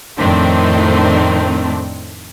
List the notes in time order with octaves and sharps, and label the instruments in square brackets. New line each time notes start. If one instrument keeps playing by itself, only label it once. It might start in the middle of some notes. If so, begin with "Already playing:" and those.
[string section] F2 A2 D#3 C4 D4